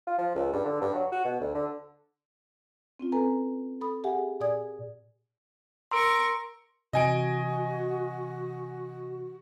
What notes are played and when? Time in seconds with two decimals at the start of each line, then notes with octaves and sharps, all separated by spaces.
0.07 F4
0.18 F3
0.35 C#2
0.53 G2
0.65 D3
0.81 G2
0.95 F#3
1.12 F#4
1.25 B2
1.40 D2
1.55 D3
2.99 C4 C#4 F4
3.12 C4 A4 B4 G#5 A#5
3.81 A4 B5 D#6
4.04 G4 G#4 E5 F#5 G#5
4.40 A#2 G#4 D5 G#5 D#6 G#6
5.91 A#4 A#5 C6 C#6 E6 D7
6.93 C3 E3 F#4 D#5 G#5 D7